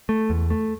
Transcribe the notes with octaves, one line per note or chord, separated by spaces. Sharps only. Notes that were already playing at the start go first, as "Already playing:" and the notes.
A3
E2
A3